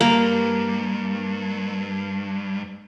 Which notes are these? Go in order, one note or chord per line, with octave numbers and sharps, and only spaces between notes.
G2 A#3